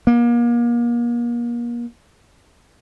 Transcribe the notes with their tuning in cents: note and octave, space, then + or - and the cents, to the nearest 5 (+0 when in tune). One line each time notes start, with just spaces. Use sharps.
A#3 +35